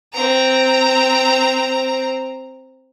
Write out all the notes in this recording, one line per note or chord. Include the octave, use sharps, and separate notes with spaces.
C4 A#5